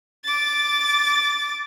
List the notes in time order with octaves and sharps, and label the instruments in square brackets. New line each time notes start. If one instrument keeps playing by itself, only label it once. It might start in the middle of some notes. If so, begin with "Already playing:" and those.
[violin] D6 A6